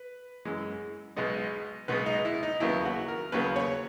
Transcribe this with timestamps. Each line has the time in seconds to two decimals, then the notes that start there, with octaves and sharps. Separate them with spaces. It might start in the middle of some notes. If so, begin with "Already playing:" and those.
Already playing: B4
0.45 F#2 E3 G#3
1.17 B1 B2 G#3 B3 D#5
1.88 B1 B2 G#3 B3 B4
2.06 D#4
2.25 E4
2.43 D#4
2.60 D#2 C#3 F#3 B3 E4
2.85 F#4
3.08 A#4
3.32 D#2 C#3 F#3 B3 B4
3.56 C#5